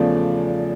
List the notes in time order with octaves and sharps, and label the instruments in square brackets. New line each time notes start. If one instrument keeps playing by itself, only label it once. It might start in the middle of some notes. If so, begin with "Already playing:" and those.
Already playing: [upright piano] E2 C#3 F3 A3 D5